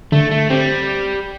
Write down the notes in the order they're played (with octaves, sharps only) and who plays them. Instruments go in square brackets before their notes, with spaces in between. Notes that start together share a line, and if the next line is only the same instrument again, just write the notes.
[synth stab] D3 [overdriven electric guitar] A3
[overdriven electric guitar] A3
[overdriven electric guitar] G3 [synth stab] C4